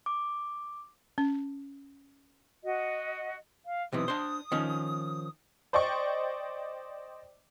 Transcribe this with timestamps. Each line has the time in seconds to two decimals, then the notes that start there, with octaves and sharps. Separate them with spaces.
0.06 D6
1.18 C#4
2.64 F#4 D#5
3.65 F5
3.92 B1 C3 E3 D#6
4.08 D4 C5
4.52 D#3 F3 C#4
5.73 C5 D5 D#5 G5 C#6